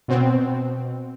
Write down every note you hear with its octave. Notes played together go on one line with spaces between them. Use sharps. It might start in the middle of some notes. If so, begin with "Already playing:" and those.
B2 C4